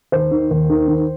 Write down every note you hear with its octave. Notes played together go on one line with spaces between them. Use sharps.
D#2 C5
D#3
D#2
D#3
D#3